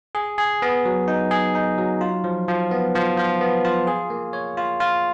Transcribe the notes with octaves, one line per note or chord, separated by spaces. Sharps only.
G#4
G#4
B3
F#3
D#4
G#4
D#4
F#3
F4
F3
F3
B3
F3
F3
B3
F4
G#4
A#3
C#5
F4
F4